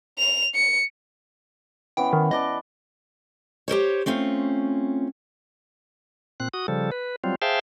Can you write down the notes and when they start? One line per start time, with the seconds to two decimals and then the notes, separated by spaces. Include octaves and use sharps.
0.18 F7
0.55 C#7
1.97 E3 B3 C#4 G5
2.13 D#3
2.31 B4 D5 D#5 A5
3.68 G4 A#4 C5 C#5
4.06 A3 C4 C#4 F4
6.40 A#2 C4 F#6
6.54 F#4 D#6
6.68 C#3 F3 G3 A4
6.92 B4
7.24 F#3 G3 C4 F4
7.42 G#4 C5 E5 F5 G5 A5